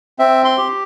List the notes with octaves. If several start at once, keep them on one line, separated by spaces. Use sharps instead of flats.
C4 E5
C6
G4